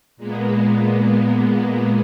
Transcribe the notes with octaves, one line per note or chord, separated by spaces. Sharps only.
A#2 G#3 A#3 B3